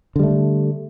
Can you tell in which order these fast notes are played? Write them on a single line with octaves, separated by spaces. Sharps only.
D3 G3 A3